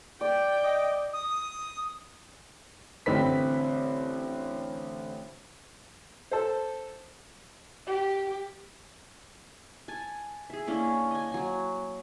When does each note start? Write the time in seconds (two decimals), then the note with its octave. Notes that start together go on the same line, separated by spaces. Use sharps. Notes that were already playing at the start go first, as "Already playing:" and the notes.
0.21 D5 G5
0.63 D#5 D6
1.13 D#6
3.06 A1 D3 C4 B4 B6
6.32 A4 C5
7.87 G4
9.88 G#5 A5
10.50 G#4 E5
10.67 A#3 C#4 D4 E4
11.11 D#5 G#5
11.32 F#3 G#5